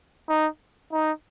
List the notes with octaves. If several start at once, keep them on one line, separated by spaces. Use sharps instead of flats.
D#4
D#4